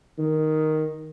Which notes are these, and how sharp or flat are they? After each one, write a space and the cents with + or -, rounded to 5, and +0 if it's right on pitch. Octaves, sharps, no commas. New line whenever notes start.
D#3 +0